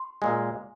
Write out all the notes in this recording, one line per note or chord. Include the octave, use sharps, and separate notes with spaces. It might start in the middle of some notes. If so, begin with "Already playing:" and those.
Already playing: C6
A#2 G#3 G#5